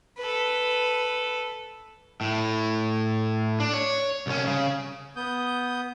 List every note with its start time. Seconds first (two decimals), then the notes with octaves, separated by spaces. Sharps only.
0.18 A4 B4
2.21 A2
3.60 D4
3.74 C#5
4.27 C2 C#4
4.47 C#3
5.16 B3 D#6 G6